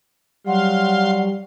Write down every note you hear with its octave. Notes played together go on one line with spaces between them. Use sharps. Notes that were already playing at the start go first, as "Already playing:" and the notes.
F#3 G3 F5 F#5 C6